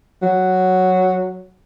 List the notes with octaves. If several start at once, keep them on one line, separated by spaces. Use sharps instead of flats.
F#3